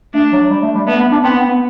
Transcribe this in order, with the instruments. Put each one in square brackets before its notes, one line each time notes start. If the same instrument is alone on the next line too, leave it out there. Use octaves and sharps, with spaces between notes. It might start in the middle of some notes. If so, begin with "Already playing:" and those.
[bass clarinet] A3 [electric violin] D4
[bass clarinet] F#3
G3
A3
G3
[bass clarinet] A3 [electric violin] B3
[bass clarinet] B3
D4
[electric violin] B3 [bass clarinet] C4
[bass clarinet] B3
B3